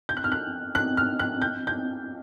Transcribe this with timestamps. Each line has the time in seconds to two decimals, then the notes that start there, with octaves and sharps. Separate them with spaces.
0.09 G6
0.17 F#6
0.24 F6
0.32 F#6
0.75 F#6
0.97 F6
1.19 F#6
1.42 G6
1.67 G6